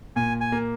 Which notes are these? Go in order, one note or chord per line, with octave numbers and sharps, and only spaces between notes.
A#2 G#5
G#5
A#3